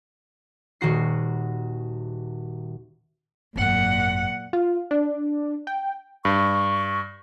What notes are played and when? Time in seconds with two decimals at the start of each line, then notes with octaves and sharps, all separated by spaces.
0.81 D#1 D#3 F#4 C7
3.56 G#1 F#2 A#2 F#5
4.53 F4
4.91 D4
5.67 G5
6.25 G2 C#6